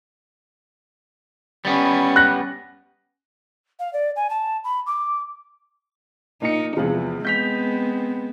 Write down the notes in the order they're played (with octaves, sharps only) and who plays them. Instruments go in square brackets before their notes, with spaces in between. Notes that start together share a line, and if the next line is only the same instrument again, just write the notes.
[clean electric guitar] G3 B3 [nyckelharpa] C#4
[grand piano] F#6 A#6
[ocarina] F5
D5
G#5
A5
B5
D6
[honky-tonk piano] A#2 C#7 [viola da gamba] D#4
[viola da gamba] E2 [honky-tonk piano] C3 F3 G#3
[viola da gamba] G#3 B3 C4 [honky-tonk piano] G6 B6 F7